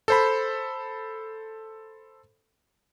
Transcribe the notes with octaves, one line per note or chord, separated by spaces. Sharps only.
A4 C5 B5